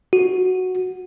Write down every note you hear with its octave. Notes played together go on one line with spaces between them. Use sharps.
F#4